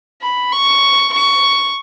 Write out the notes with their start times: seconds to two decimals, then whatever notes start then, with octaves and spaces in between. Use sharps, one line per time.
0.22 B5
0.52 C#6
1.13 C#6